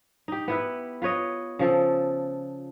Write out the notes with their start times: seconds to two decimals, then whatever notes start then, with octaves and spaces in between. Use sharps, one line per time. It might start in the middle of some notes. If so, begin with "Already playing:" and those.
0.28 D#4 G4
0.48 B3 E4 B4
1.02 F4 B4 C#5 D#5
1.59 C#3 F3 A4